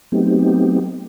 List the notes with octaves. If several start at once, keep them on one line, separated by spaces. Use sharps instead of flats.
F#3 A3 B3 C4 D#4 G4